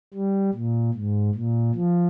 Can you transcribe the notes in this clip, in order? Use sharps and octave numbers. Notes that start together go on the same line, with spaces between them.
G3
A#2
G#2
A#2
F3